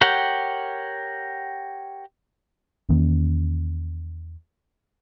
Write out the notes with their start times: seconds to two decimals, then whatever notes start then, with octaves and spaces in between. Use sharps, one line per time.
0.01 G4 A#4 C#5 F#5 G5
2.89 E2 D#3 A#3 C#4